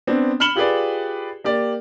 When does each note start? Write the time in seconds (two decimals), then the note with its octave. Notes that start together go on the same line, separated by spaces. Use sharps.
0.07 B3 C4 D4
0.40 B5 F6 C#7 E7 F#7 G7
0.55 F4 G4 G#4 B4 D5
1.44 A#3 G4 D5